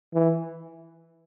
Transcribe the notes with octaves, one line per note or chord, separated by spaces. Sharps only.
E3